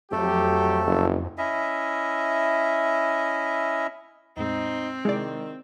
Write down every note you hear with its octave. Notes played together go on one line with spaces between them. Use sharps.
F2 F#3 A3 G4 A4
F#1
C#4 E4 D#5 E5
E2 A2 G#3 C4 D#4
C3 D#3 G#3 E4 G#4 D5